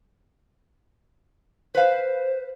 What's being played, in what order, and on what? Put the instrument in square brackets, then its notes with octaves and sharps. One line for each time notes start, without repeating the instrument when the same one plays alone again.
[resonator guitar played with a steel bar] B4 F5 [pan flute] C5